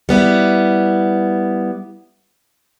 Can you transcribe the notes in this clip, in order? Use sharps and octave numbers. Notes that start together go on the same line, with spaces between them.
G3 B3 E4